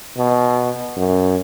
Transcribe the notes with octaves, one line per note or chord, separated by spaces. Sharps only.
B2
F#2